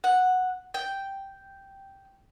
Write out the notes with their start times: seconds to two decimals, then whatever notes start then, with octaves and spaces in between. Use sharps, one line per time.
0.04 F#5
0.74 G5